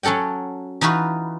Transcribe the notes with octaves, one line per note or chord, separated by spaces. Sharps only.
F#3 C#4 A4 F#5 G5
E3 D#4 F4 F#4 B4